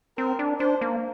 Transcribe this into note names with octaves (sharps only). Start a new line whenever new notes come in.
C4 A#4
D4
D4 C5
A#3